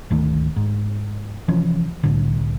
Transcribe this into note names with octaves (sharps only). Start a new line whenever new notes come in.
G#1 D2 D#3 A3
G#2
C3 E3 F3 C#4
C2 A2 D3